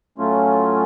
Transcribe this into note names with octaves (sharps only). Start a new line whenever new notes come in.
A2 F#3 A3 C#4 F4